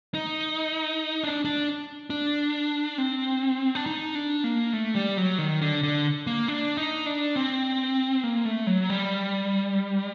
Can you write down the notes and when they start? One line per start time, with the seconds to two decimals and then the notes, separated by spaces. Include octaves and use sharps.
0.14 D#4
1.23 D4
1.45 D4
2.10 D4
2.98 C4
3.75 D4
3.86 D#4
4.15 D4
4.44 A#3
4.73 A3
4.95 G3
5.17 F#3
5.38 D#3
5.61 D3
5.83 D3
6.27 A#3
6.48 D4
6.77 D#4
7.06 D4
7.36 C4
8.24 A#3
8.45 A3
8.67 F#3
8.90 G3